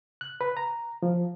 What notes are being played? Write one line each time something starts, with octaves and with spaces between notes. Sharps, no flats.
F#6
B4
A#5
F3